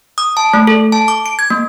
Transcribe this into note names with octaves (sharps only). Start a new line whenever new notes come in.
D#6
A5
A3
A4
A5
D6
D7
G#6
A#3